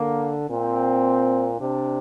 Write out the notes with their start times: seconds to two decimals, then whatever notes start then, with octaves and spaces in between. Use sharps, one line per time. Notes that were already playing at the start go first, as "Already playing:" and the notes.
Already playing: D3 A#3
0.49 A#2 C4
1.60 C3 D4